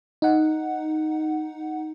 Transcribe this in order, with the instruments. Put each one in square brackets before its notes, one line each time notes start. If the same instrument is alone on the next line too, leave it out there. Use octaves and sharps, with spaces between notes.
[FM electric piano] D#4 F#5